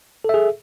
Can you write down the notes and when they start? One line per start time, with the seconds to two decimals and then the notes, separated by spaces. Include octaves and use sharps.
0.24 A4
0.29 E5
0.34 G#4